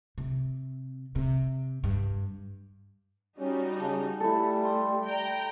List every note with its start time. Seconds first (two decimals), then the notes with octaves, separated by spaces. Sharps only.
0.18 C3
1.15 C3
1.84 G2
3.39 G3 C#4 D#4 F#4
3.80 C#3 G#5 A5
4.20 G3 A3 E4 A4
4.64 G4 G5 C6
5.05 D5 G5 A#5